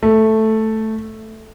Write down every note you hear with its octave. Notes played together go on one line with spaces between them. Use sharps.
A3